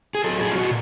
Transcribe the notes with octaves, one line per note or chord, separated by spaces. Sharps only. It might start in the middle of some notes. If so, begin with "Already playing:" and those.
G#4
F#3 A4
A#2 G#4
F4
A#2 F#4